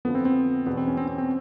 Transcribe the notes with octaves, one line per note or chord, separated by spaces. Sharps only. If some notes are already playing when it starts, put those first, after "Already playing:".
F2 D3 F3 B3
C4
C4
E2 B2 B3
C4
C#4
C4
C4
C4